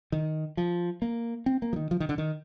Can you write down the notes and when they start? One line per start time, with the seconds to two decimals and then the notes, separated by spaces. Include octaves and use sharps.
0.12 D#3
0.57 F3
1.02 A#3
1.46 C4
1.62 A#3
1.73 F3
1.76 D#3
1.91 F3
2.00 D#3
2.09 D3
2.18 D#3